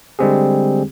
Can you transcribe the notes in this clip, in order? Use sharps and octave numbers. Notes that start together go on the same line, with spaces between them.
D3 G3 G#3 C4 G4 G#4